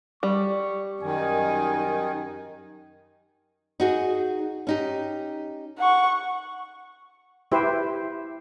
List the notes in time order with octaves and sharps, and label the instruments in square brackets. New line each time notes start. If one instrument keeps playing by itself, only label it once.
[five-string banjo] G3 [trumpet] C#6
[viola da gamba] F#2 D#4 [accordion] D#3 [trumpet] G#5
[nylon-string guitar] D#4 F#4 G#4
C#4 D#4 G4
[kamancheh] F#5 C#6
[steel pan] E4 G4 B4 C5 E5